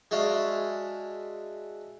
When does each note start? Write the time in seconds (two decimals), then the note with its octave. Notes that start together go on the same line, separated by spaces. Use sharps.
0.11 G#3 D4 F#4 E5 F5